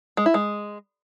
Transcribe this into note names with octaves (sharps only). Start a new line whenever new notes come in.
G#3
E4
G#3